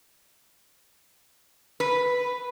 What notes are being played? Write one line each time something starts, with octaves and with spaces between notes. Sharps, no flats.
B4